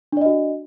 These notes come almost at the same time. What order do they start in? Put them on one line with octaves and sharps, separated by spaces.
D4 D5 D#5 F#4